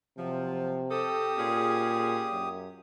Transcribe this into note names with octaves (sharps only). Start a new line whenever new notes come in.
C3 F3 F#3
C4 G4 A4 D#6
A#2 C#4 F4 G#4
F#2